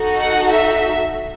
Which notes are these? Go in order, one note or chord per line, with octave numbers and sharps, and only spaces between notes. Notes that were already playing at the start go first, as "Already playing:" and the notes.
Already playing: D#4 F#4 A4
F#5
E5